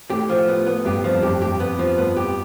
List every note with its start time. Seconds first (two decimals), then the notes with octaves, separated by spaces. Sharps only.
0.10 A2 G4
0.29 F3
0.48 B3
0.67 B3
0.85 G2 G4
1.04 F3
1.10 F2
1.23 G2 G4
1.42 G4
1.60 F2 B3
1.79 F3
1.98 G2 B3
2.17 G4